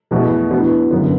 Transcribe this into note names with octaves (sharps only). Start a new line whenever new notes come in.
E2 B2 A3 F#4
E3 B3 D4 F#4
F#2 D3 B3